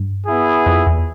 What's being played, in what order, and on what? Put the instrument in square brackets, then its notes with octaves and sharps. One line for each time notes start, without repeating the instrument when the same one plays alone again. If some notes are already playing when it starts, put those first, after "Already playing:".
Already playing: [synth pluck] G2
[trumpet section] B3 E4 G#4
[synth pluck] F2
E2